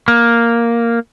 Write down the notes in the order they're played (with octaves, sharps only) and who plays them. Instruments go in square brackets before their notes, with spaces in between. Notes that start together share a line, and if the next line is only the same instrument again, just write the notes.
[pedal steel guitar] A#3